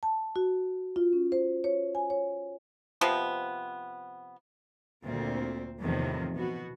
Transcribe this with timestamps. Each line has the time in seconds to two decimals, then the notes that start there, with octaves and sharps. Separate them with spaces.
0.03 A5
0.36 F#4
0.96 F4
1.13 C#4
1.32 C5
1.64 C#5
1.95 G#5
2.10 C#5
3.01 C3 F3 B3
5.05 D2 A#2 C4
5.82 E2 A2 C3 D#3 F3
6.35 B2 B3 F#4